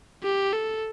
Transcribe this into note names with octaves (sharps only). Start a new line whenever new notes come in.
G4
A4